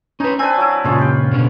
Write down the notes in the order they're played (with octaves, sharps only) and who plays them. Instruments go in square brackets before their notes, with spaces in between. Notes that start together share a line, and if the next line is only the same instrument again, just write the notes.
[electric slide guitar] C#4 B4 [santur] D#4
[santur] C4 D4 B4 [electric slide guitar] G#5
[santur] F#3 E4
[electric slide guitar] A#2 C#3 [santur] G#3 F4 C#5
[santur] G4 G5
[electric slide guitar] B2 D3 C#4